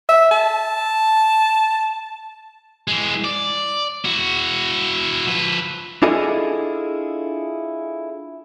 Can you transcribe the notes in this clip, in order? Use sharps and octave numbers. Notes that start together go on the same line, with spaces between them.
E5
A5
E3 G#3
D5
E4 F#4
F3 B4
D4 E4 F4 G#4 A4 D#5